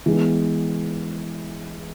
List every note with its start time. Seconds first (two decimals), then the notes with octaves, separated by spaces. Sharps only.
0.06 E3 G#3 B3